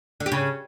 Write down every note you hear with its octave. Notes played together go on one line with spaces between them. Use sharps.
D3
G4
C#3